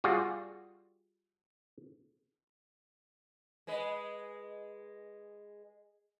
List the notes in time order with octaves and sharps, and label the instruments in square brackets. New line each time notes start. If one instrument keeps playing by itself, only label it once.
[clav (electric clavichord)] G3 F4 F#4 G#4
[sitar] G#3 B4 D#5